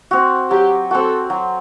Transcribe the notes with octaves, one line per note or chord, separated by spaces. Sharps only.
C4 F#4
F#3 G4
C4 F#4 A4
F#3